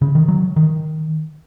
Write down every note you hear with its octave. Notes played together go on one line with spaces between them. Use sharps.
C#3
D#3
F#3
D#3